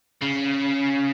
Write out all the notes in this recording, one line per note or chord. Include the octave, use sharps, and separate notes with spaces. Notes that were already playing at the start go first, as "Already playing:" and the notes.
C#3